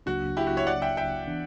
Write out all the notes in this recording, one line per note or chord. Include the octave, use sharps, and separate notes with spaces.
C#2 C#3 F#3 A#3 D4 F#4
E4 G4
F#4
C#5 E5
D5 F#5
E5 G5
E5 G5
E3 B3 D4